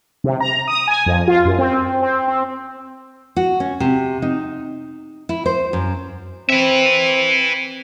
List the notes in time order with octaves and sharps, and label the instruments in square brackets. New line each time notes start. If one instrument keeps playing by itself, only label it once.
[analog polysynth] C3
A#5
D#6
G#5
F2
F4
F#2
C4
C4
C4
[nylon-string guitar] F#4
C#4
C3
D#4
E4
C5
F#2
[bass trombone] C4 [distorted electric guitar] B4 E5